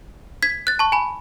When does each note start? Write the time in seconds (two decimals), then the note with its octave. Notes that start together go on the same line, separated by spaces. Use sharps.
0.43 G#6 B6
0.67 F#6 A6
0.79 A5 C#6
0.92 G#5 B5